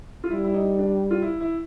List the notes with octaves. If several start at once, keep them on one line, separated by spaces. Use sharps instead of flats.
F4
G3 E4
E4
D#4
D4
F4
E4
E4